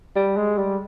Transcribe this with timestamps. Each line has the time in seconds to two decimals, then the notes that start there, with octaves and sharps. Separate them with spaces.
0.16 G3
0.37 G#3
0.58 G3